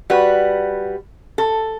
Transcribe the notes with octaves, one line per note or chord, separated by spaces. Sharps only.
G3 F#4 B4
A4